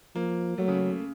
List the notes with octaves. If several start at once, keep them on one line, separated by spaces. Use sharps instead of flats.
F3 A#3
F#3 A3
C#3
C#3
C#3